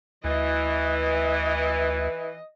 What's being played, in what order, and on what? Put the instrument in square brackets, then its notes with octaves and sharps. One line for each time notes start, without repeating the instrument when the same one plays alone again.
[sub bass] D2 [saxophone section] E3 [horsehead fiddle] D#5